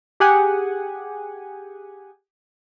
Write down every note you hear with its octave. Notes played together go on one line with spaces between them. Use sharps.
G4 G#4 F#5 G#5